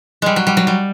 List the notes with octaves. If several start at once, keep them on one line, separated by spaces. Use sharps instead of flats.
G3 G#3
F#3
G3
F#3
G3